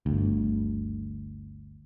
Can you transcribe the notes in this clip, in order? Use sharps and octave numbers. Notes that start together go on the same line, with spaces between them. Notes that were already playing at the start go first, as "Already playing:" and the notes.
G1 D2